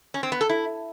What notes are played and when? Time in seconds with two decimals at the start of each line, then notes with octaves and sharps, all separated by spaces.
0.14 C#4
0.23 C4
0.32 B3
0.41 A4
0.49 E4